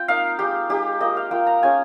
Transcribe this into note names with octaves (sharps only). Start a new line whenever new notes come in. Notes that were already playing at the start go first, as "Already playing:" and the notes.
Already playing: C4 F4 G5
A#3 D#4 F5
G#3 D#4 G4
G#3 D#4 G4
A#3 F4 D#5
F5
A#3 F4 G5
A#5
G#3 C#4 F4 G#5